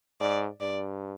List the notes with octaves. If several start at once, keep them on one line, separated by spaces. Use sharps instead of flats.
G#2 D5
G2 D5